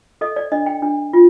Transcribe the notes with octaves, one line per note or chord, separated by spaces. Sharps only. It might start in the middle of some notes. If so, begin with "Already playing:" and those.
A4 D#5
D5
D4 D#5
G5
D4
F4